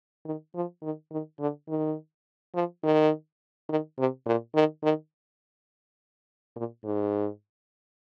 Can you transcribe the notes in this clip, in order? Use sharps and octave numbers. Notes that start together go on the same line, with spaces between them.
D#3
F3
D#3
D#3
D3
D#3
F3
D#3
D#3
C3
A#2
D#3
D#3
A#2
G#2